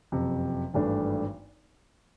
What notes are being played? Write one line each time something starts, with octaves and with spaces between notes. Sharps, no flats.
F#1 F2 C3
G#1 G2 E3 A3 D4